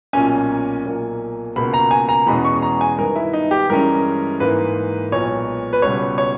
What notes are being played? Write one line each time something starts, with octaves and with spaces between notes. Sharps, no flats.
B1 A#2 A#3 C#4 G#5
B1 A#2 A#3
C#2 B2 A#3 B5
A#5
G#5
A#5
E2 B2 G#3 C#4 B5
C#6
A#5
G#5
G2 D#3 G#3 B3 A#4
E4
D#4
G4
G2 E3 G#3 C#4 A#4
G#2 E3 A#3 B4
B1 A#2 G#3 B3 C#5
B4
C#2 B2 G3 C#5
C#5